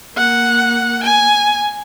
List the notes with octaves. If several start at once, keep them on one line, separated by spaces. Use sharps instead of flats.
A#3 F#5
G#5